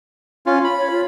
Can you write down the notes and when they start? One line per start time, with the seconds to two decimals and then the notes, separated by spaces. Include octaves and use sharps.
0.46 C#4 F4
0.64 B5
0.78 C#5
0.90 F4